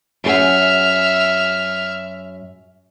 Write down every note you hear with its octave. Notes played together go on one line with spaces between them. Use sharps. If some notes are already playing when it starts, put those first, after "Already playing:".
F#2 G#4 E5 F#5 F6